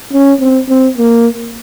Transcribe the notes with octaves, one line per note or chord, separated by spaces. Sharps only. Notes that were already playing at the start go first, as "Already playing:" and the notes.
C#4
C4
C4
A#3